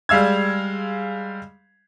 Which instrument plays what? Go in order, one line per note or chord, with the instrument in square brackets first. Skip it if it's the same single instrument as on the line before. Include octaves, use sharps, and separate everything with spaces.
[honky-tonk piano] G3 G#3 F5 E6 G#6